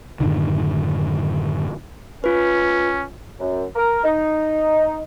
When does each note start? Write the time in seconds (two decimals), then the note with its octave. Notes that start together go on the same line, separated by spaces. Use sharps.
0.20 F#2 A2 D3 D#3
2.24 C#4 F4 B4
3.39 F#2
3.76 A#4
4.04 D#4